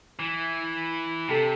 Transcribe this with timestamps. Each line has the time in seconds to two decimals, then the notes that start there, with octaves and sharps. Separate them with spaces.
0.19 E3
1.29 C3 G4 A4